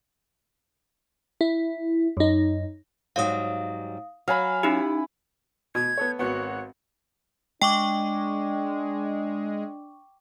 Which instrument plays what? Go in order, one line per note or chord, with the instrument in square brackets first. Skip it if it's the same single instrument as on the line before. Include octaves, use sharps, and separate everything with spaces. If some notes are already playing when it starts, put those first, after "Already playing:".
[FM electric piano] E4
F#2 D#4
[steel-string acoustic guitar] G#2 F#3 G3 [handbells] F5 D#6
[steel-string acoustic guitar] F#3 [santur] F5 G#5 B5
[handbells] C#4 D#4 G4 [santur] E4
[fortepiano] B2 [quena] G#6
[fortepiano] B3 A4 C#5
[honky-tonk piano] G#1 F#4 F#5 [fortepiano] B3 [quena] C#5
[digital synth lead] G#3 [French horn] D4 [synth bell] G5 C#6 D6